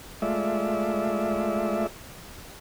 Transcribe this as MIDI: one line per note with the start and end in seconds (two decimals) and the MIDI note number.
0.22 1.87 56
0.22 1.87 57
0.22 1.87 65
0.22 1.87 74
0.22 1.87 76